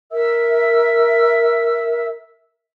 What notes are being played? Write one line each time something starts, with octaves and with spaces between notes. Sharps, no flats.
A#4 E5 E6